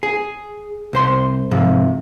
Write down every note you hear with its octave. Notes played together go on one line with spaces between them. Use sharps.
G#4
C2 C5 C6
G#2 C3 F3